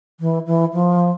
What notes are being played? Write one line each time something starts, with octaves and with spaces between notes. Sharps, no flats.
E3
E3
F3